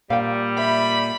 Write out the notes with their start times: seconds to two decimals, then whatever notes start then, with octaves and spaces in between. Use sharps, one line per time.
0.10 A#2 G3 F5 G5
0.58 E5 B5